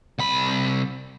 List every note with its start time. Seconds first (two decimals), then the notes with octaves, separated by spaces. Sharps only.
0.19 C2 B5